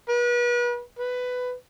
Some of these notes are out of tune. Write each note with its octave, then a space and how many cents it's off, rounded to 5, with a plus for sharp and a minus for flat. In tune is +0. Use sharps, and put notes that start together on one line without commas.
B4 -35
B4 +15